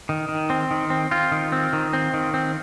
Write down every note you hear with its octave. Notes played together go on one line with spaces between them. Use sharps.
D#3
D#3
C4
D#3
C4
C4 F4
D#3
C4
D#3
C4
D#3
C4